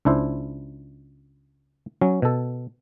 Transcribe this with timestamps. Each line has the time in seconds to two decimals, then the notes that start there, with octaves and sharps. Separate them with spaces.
0.05 C#2 D4 E4 C5
2.01 F#3 C#4
2.22 B2 A4